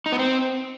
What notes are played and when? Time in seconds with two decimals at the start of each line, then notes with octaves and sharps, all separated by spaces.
0.06 D#4
0.12 B3
0.19 C4